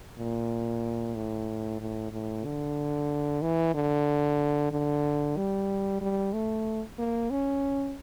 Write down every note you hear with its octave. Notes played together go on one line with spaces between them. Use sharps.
A#2
A2
A2
A2
D3
E3
D3
D3
G3
G3
A3
A#3
C#4